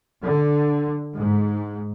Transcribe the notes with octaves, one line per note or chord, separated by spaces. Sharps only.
D3
G#2